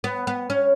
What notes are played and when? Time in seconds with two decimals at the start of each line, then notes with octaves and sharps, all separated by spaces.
0.04 B3
0.27 B3
0.50 C#4